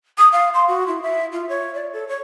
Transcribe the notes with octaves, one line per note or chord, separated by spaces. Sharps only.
D#6
F5
C6
F#4
E4
E5
F4
C#5
D5
A4
C#5